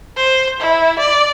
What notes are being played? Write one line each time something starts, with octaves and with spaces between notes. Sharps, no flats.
C5
E4
D5